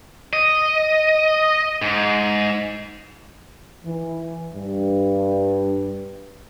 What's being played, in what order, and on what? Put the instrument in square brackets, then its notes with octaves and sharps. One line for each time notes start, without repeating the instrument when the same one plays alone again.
[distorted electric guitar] D#5
G#2
[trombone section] E3
G2